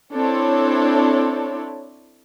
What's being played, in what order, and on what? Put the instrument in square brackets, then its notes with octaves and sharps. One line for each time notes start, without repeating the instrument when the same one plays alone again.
[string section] C4 D4 E4 A4 C#5